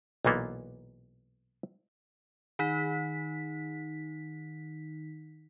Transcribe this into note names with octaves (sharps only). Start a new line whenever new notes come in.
B1 A#2 E3 A#3 B3
D#3 D#4 B6